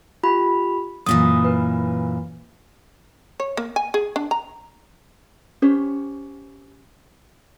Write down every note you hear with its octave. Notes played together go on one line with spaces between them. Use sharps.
F4 G4 B5
F#2 A#2 E3 D#6
B4
C#5
A#3
G#5
G#4
D4
A#5
C#4 G4 C5 C#5